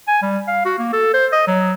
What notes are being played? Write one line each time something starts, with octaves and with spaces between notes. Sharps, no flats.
G#5
G3
F5
F#4
A#3
A4
C5
D#5
F#3